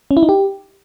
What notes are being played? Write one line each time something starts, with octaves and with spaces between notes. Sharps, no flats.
C#4
E4
D#4
G4